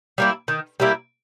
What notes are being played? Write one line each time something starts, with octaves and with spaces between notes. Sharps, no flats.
G3 A#3 E4
D#3
G3 A#3 E4